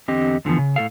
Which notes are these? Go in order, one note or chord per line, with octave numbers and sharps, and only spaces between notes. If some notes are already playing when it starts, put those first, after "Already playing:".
E2 D3 C4 G4 D#5
F2 D3 E3 F3 B3
C#3
A2 A4 F5